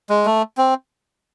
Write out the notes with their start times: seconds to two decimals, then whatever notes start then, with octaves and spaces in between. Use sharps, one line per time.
0.10 G#3
0.26 A3
0.58 C4